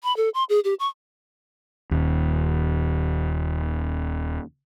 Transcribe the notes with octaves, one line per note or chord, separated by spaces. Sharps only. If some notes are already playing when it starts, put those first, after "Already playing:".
B5
A4
C6
G#4
G4
C#6
D#1 D#2